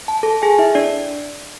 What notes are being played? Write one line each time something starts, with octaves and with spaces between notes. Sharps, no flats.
A5
A4 A5
G#4 G#5
E4 E5
D4 D5